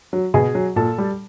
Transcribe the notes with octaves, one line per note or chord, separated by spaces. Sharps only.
F#3
B2 G#4 G#5
F#3
A#2 A4 A5
G3